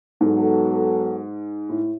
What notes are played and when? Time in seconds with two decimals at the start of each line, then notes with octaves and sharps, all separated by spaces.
0.21 G#2 F#3 B3 F#4 A4
1.69 A2